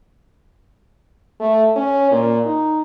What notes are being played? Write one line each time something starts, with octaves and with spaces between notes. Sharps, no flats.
A3
C#4
A#2
D#4